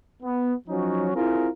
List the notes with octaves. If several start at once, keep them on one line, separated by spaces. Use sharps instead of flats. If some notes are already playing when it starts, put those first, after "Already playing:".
B3
F3 F#3 C#4 D#4 F#4
C4 E4 F4 G#4 A#4